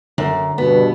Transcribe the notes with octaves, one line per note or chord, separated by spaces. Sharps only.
F#2 D3
G2 B2 B3